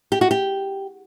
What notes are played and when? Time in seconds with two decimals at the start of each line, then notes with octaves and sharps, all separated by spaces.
0.12 G4
0.21 F#4
0.31 G4